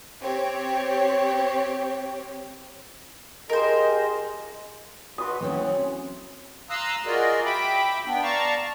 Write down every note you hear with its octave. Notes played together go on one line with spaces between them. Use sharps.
C4 G4 C#5
F4 G4 G#4 A#4 C5 D#5
F#4 B4 C6 D#6
E3 F#3 A3 C4 C#4
F5 A#5 C6 D#6 E6 F#6
F4 F#4 G#4 A#4 D5 D#5
E5 G5 B5 D6
B3 D4 G5
D5 F5 A5 A#5 C#6